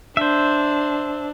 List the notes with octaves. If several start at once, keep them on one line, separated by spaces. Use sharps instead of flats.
D4 C5 E5